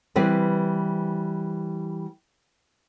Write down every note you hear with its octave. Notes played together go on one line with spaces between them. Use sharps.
E3 G3 C4 B4